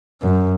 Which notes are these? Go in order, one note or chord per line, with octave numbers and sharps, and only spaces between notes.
F#2